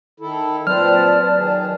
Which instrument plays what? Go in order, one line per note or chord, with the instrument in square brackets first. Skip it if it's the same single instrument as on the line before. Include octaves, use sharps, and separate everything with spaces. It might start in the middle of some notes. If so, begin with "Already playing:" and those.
[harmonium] D#3 E4 A4
[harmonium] A#2 C4 C5 [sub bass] F#3 [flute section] B4 D5 A5 [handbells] F6
[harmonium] D#3 G#4